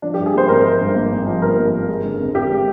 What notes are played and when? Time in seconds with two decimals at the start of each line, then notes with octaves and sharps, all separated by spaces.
0.02 F3 D4
0.14 G4
0.18 G2
0.26 G#4
0.33 A#3 C5
0.49 G#1 A#4
0.64 F3
0.81 G2
0.95 A#3
1.12 G#1
1.27 F3
1.42 G2 A#4
1.57 A#3
1.74 G#1
1.89 G#3
2.04 D3
2.20 F2
2.35 F2 G4
2.51 G#3